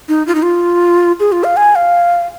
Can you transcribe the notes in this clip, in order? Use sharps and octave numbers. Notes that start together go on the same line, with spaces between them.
D#4
F4
D#4
F4
G#4
F4
F5
G#5
F5